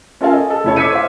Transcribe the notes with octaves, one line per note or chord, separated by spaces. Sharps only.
C#4 F4 A4 A#4 F5 G#5
D#5
A4
F1 C#3 E4 A4 C#5
D6 E6 G#6 B6 C#7 D#7
C5 F5